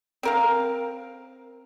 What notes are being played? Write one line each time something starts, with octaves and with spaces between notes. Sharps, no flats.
C4 A#4 F5